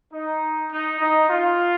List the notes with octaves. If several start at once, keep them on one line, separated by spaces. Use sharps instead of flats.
D#4
D#4
D#4
F4